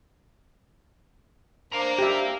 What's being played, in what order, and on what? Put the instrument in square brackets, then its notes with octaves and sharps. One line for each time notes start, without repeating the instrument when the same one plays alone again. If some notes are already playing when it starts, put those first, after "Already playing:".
[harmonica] D4 A#4 C5 [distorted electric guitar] F5 A#5
[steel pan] G4 E5